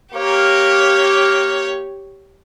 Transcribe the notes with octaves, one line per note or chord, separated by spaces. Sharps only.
A#3 G4 C#5